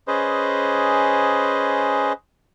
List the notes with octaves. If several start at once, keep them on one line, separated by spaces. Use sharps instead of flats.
C#4 G#4 B4 C5 D#5